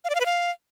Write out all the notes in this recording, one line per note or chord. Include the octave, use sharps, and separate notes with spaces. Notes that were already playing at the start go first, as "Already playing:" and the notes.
F5
D5
F5
B4
F5